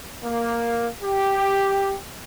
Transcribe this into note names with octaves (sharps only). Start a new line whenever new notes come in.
A#3
G4